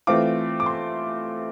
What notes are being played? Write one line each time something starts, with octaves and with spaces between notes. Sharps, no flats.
E3 A3 C4 F4 D6
D6
C6